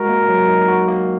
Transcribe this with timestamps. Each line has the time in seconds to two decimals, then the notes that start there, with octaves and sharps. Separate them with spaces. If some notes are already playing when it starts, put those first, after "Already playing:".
Already playing: G#3 F#4 A#4
0.09 A#3
0.29 F#3
0.49 D#4
0.68 F#4
0.88 A#3